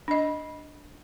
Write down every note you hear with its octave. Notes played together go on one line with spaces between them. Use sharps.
D4 D#5